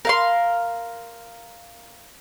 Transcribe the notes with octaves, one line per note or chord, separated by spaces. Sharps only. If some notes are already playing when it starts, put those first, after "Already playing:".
A#4 F5 C6